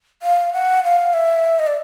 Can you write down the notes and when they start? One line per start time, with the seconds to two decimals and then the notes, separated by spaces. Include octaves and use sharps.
0.22 F5
0.53 F#5
0.84 F5
1.13 E5
1.59 D#5
1.67 D5